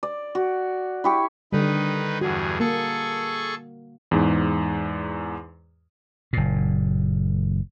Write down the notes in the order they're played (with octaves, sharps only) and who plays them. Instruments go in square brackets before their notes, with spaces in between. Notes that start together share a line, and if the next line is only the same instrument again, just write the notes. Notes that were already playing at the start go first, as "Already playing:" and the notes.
[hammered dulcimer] D5
F#4
E4 G4 C#6
[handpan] D3 G3 [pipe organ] D#3 D#4 B4
[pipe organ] E2 G2 G#4 [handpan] F#4
[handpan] A#3 [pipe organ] G#4 A4 C#6
[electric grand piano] E2 G#2
[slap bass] F#1 A#2